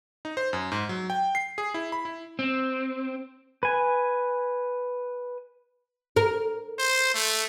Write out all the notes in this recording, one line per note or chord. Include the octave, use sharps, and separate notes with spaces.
D#4
C5
F#2
G#2
F#3
G5
C7
G#4
E4
B5
E4
C4
B4 G#5
A#4
C5
A3